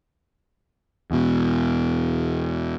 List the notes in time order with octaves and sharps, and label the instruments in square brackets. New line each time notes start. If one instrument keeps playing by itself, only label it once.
[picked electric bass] E2 B2